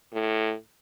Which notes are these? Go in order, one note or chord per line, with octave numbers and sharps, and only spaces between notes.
A2